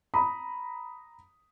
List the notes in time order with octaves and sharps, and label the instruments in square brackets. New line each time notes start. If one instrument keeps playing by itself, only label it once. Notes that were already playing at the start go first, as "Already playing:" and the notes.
[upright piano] A#5 B5 D#6